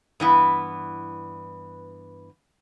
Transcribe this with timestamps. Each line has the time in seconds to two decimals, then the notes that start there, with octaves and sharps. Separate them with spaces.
0.20 G2 E3 B3